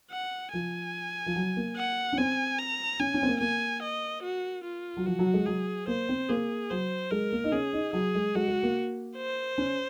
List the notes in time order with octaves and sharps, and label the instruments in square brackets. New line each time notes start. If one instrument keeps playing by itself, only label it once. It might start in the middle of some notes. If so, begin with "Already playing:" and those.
[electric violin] F#5
[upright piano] F3 [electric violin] G#5
[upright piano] F3
F#3
A#3
[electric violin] F#5
[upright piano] C#4
[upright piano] C4 [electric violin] G#5
[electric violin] A#5
[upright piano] C#4 [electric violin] G#5
[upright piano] C#4
C4
A#3
[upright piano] A#3 [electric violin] G#5
[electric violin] D#5
F#4
F4
[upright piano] F#3
[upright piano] F3 [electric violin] F#4
[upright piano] F#3
G#3
[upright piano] F#3 [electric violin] G#4
[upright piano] A#3 [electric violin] C5
[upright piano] C4
[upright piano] A#3 [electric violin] G#4
[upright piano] F#3 [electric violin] C5
[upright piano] G#3 [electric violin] A#4
[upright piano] A#3
D#4
[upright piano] C#4 [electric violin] G#4
[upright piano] D#4
[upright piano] F#3 [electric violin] G#4
[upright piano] G#3
[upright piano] G#3 [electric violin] F#4
[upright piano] G#3
A#3
[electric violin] C5
[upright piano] C#4